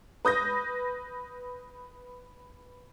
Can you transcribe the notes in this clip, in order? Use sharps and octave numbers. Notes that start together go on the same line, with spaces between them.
B4 D#6 G6 A#6